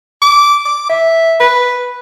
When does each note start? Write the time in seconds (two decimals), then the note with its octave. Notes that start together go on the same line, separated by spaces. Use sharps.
0.22 D6
0.66 D6
0.90 E5
1.40 B4